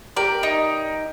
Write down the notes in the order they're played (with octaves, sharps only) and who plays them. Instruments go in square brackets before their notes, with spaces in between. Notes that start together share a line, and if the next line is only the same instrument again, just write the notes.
[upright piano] G4 A#4 [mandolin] D5
[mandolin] D#4